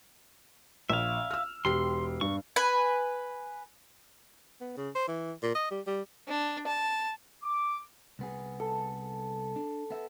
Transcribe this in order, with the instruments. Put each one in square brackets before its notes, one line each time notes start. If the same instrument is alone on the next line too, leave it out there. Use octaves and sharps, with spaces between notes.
[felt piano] A#1 [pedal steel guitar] E5 F5
[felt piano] E6 F6
[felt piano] E1 G4 C7 [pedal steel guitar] C6
[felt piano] G2 [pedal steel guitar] C#6
[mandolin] B4 G#5
[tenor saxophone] B3
C#3
C5
E3
A#2
D#5
G3
G3
[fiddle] D4
A5
[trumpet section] D6
[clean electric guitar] C2 B3 G#4
[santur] A4
[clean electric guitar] D4
B3 E5